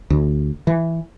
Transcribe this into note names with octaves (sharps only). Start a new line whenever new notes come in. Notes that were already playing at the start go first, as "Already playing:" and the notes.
D2
E3